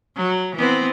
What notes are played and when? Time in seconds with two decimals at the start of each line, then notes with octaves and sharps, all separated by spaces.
0.16 F#3
0.56 E3 B3 C4